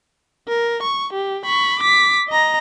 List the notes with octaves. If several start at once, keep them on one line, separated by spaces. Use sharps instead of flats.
A#4
C#6
G4
B5 C#6
D6 B6
D#5 A#5